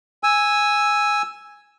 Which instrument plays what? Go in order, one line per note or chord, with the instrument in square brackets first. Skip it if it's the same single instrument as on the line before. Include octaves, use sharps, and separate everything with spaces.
[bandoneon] G#5 E6